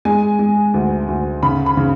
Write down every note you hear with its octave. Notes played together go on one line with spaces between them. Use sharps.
G#3 G#5
G#3
D2
D2
C#3 B5
B5
C#3